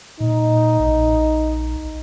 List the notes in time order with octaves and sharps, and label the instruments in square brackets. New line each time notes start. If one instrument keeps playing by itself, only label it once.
[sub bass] A#2 [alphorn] D#4
[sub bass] A#1